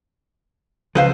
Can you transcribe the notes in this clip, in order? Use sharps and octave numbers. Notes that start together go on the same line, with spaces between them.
C#2 F3 B4 C5 F5